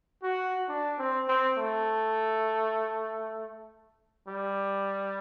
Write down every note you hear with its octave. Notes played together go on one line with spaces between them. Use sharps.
F#4
D4
C4
C4
A3
G3